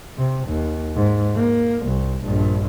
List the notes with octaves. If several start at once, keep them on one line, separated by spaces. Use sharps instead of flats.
C3
D#2
G#2
A#3
C2
A#1 G2